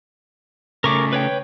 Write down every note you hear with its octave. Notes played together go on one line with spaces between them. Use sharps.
C#3 A3 A#4 C#6 D6
B4 C#5 G5